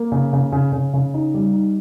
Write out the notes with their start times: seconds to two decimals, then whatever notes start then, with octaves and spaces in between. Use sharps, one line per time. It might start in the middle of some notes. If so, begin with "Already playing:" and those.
Already playing: A#3
0.12 C#3
0.33 C#3
0.52 C#3
0.72 C#3
0.94 C#3
1.14 D#4
1.34 G3
1.54 D#4